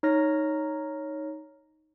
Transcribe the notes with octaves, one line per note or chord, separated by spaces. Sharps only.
D#4 C#5 F6 A#6